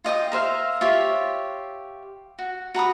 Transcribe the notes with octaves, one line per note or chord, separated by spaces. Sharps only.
F4 D#5 G5 D#6
A#4 C5 E5 F5
F4 G4 C#5 E5
F#4
F#4 A#5 B5 D#6